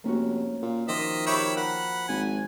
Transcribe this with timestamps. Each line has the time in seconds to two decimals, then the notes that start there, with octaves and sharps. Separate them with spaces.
0.04 F1 A#3 C#4 F#4
0.62 A#2
0.88 D#3 F3 C5 D#5 E5 D6
1.26 G4 C#5 E5 B5
1.57 A#4 F#5 B5
2.08 G#1 G#5